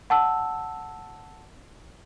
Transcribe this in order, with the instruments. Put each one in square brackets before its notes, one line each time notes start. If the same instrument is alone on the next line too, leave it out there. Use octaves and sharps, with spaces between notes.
[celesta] F#5 A5 E6